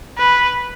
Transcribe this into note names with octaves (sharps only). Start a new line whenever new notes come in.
B4